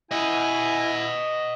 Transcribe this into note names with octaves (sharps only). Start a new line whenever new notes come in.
E4 D#5 F#5 G#5